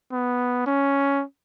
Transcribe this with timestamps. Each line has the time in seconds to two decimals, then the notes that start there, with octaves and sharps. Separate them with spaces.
0.13 B3
0.67 C#4